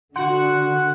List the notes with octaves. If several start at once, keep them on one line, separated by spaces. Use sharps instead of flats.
D3 F#4 F#5 C6